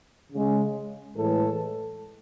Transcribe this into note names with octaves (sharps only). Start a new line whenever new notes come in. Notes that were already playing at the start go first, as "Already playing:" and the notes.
C#3 G#3
A2 E3 G#3 A4